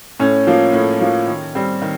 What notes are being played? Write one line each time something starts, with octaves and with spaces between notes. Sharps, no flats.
A2 C#4
F3 A#3
A2
F3 A#3
D#3
G3 C4
D#3